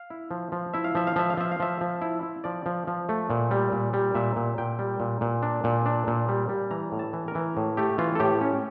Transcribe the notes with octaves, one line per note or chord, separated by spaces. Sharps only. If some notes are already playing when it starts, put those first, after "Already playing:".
Already playing: F5
E4
F3
F3
E4 E5
F5
F3 E5
F5
F3 E5
F5
F3 E5
F5
F3 E5
F3
E4
E4
F3 D5
F3
F3
A3
A#2
G3
A#2
G3
A#2 E5
A#2
A#2 G5
G3
A#2
A#2
D4
A#2
D4
A#2
G3
G3
E3 A#5
A2
A5
E3
A#4
E3
A2
A3 G4
E3 F4
A4
A2 G4
C#4